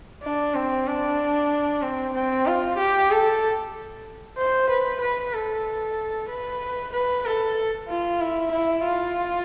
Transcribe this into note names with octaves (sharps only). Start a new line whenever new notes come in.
D4
C4
D4
C4
C4
F4
G4
A4
C5
B4
B4
A4
B4
B4
A4
F4
E4
E4
F4